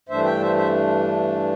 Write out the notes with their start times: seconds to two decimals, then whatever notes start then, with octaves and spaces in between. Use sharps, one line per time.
0.09 G2 E3 A3 D4 C5 E5
0.24 E5 G5
0.40 C5 E5
0.56 C5 E5